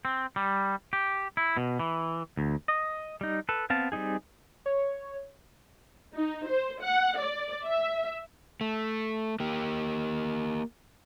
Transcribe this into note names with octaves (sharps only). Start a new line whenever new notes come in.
C4
G3
G4
E4
B2
E3
D2
D#5
G3 D#4
A4 B4
B3 C4 F5 A5
G3 C4 D#4 G#4
C#5
D#4
C5
F#5
D5
E5
A3
A#3 G4